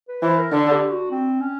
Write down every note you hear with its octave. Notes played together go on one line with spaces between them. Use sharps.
B4
E3 C5
A#4
D3 A4
G4
F#4
C4
C#4